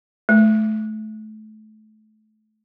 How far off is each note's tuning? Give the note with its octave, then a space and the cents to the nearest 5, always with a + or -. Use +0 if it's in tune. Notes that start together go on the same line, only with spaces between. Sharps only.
A3 -30